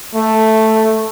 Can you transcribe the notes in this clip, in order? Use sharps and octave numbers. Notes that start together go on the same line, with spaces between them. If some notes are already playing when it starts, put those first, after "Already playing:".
A3